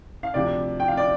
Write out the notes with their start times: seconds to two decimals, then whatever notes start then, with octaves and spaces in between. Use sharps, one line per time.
0.23 F5
0.34 D2 C3 F3 D5
0.80 G5
0.88 F5
0.97 D5